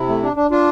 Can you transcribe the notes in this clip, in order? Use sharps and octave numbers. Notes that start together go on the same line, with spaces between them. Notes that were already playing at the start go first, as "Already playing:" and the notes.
Already playing: C3 E4
A3
D4
D4
D4 F4